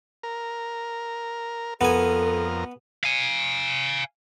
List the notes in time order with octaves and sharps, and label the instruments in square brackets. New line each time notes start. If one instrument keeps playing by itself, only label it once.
[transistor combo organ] A#4
[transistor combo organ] F2 A#4 [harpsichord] B3 G#5 [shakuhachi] A4
[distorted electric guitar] F5 G#5